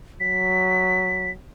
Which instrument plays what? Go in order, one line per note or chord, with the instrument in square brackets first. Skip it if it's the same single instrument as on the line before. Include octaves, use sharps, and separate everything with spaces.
[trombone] F#3 [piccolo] B6